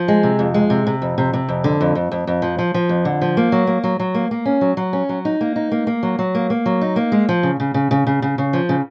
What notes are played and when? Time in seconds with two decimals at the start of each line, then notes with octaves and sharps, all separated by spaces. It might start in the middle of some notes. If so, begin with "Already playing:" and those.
Already playing: F3
0.08 G#3
0.23 C3
0.39 F2
0.54 G#3
0.70 C3
0.87 C3
1.02 F2
1.18 C3
1.33 C3
1.49 F2
1.64 D3
1.81 F2
1.95 F2
2.12 F2
2.27 F2
2.42 F3
2.59 F3
2.74 F3
2.89 F2
3.05 D3
3.22 F3
3.37 A#3
3.52 F#3
3.67 A#3
3.84 F#3
4.00 F#3
4.14 A#3
4.31 A#3
4.46 C#4
4.61 F#3
4.77 F#3
4.93 C#4
5.09 F#3
5.25 D#4
5.41 A#3
5.56 D#4
5.72 A#3
5.87 A#3
6.03 F#3
6.19 F#3
6.35 A#3
6.50 A#3
6.66 F#3
6.82 D#4
6.96 A#3
7.12 G#3
7.29 F3
7.43 C#3
7.60 C#3
7.74 C#3
7.91 C#3
8.07 C#3
8.22 C#3
8.38 C#3
8.53 F3
8.69 C#3